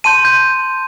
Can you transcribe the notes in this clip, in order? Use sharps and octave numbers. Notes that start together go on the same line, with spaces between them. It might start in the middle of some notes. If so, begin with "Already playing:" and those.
A5 C6 G6 D#7
G6